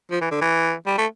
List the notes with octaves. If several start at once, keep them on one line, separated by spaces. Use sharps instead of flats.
F3
E3
D3
E3
G3
A3